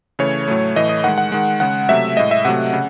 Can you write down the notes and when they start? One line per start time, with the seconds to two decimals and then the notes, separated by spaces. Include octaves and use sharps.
0.19 C#3 E3 A3 C#5
0.48 A2 F#3 A3
0.76 A2 E3 A3 D#5
0.89 D#5
1.04 D#3 G#3 F#5
1.18 F#5
1.32 D#3 G#3
1.60 C#3 G#3 F#5
1.88 C3 F#3 A3 E5
2.17 A2 G#3 D#5
2.31 E5
2.45 C3 F#3 A3 F#5
2.73 C#3